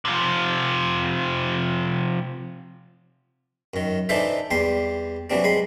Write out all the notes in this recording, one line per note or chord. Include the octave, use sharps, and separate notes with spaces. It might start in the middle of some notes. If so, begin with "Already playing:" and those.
C3 F3
F#2 D#3
E3 D4 D#4 A4 C5 E5
E2 G3 G4 C6
E3 F#3 G3 C4 D4
G#3 B5 C6